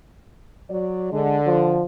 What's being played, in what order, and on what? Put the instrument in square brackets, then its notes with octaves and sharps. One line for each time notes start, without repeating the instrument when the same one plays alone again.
[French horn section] F#3 D5
[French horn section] D3 [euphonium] G#3
[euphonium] F3